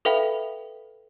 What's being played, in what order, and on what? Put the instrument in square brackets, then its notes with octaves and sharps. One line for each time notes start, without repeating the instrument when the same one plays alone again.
[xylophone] A4 B4 E5 F5 G5 B5